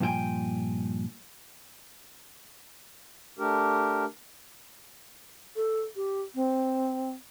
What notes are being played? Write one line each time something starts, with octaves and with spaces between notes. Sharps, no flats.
G2 A#2 F3 E4 G5 G#5
A3 D4 G4 A#4
A4
G4
C4